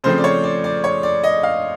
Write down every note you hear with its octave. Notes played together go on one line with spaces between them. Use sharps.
C#3 F3 A3 C4 C5
D5
C#5
D5
D5
C#5
D5
D#5
F5